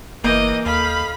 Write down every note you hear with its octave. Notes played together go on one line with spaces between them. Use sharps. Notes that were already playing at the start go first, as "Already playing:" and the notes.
F#1 E3 A#3 D#5 G6
D#2 A4 D#5 F5 B5